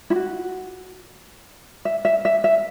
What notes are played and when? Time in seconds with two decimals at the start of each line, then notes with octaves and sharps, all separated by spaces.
0.10 E4
0.15 F#4
1.85 E5
2.05 E5
2.25 E5
2.44 E5